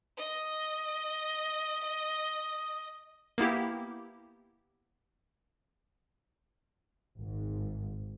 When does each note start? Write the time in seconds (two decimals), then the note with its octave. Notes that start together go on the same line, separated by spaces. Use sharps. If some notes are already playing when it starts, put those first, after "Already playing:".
0.18 D#5 D#6
3.38 A#3 B3 E4 G4
7.17 G#1 G#2